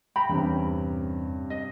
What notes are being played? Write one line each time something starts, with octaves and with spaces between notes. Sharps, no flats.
G5 A#5 B5
E2 G2 C3 C#4
D#5